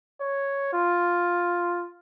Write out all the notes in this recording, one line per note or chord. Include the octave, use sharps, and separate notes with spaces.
C#5
F4